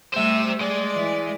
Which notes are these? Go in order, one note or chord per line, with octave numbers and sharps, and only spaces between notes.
G3 A3 C5 E5 E6
G#3 D5
E3